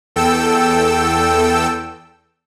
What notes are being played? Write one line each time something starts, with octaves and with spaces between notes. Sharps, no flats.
E2 A4 G5 E6